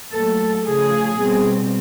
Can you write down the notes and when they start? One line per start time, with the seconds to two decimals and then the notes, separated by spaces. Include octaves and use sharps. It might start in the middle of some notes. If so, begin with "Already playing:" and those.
0.13 A#2 F#3 A3 A4
0.65 C#3 F3 A3 G#4
1.19 B2 G3 C4